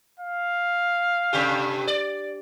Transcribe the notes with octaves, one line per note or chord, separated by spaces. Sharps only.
F5
G2 C3 G4
D5